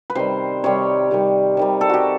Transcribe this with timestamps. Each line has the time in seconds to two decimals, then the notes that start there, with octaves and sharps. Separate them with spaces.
0.10 B4
0.15 C3 D#3 G3 C5
0.64 C3 D#3 G3 C#5
1.11 C3 D#3 G3
1.57 C3 D#3 G3
1.81 A4
1.89 F#4 G4